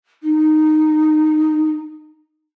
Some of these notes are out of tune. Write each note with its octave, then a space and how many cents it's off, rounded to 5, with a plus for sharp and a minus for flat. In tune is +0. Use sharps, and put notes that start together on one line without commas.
D#4 -10